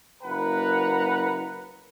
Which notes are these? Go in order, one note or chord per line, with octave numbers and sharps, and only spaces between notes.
F#1 A#3 B4 F#5 A#5